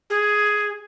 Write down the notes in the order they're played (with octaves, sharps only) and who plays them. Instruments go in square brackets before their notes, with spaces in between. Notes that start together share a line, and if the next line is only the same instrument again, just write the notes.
[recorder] G#4